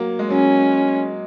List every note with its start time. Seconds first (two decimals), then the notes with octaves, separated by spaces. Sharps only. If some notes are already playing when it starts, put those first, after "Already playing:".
Already playing: F#3 A#3
0.19 G#3
0.30 F#3 C#4